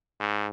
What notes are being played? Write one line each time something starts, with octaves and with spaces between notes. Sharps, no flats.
G#2